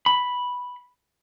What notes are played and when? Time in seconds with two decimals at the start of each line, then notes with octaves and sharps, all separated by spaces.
0.06 B5